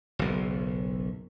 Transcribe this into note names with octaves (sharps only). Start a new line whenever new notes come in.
F#1 B1